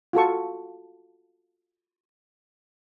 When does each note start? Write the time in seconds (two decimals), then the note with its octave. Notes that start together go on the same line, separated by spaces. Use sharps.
0.13 F4 F#4 A4 C#6